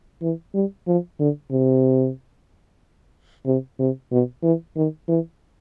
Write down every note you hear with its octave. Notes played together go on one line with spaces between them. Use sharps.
E3
G3
F3
D3
C3
C3
C3
B2
E3
D#3
E3